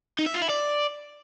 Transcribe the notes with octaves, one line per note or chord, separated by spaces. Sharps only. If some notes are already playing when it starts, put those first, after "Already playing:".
D#4
E5
F4
E4
D5